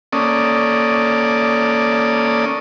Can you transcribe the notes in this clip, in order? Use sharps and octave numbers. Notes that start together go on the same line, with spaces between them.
A#3 C#4 A4 D5 D#6